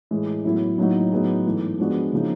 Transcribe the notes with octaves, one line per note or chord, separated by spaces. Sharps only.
A2 E3 G#3
A2 F#3 B3 E4
A2 F#3 A#3 D#4 F#4
A2 F#3 B3 D#4 G#4
G#2 E3 A3
F3 G#3 B3 D4 F#4
C#3 F3 A#3 D#4